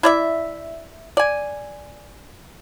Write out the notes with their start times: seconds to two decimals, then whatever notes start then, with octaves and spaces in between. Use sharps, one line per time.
0.03 E4 D5 E5
1.17 D5 G#5